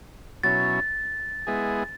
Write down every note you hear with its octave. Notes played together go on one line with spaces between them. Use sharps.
B2 F#3 C#4 E4 A6
G#3 B3 E4 G#4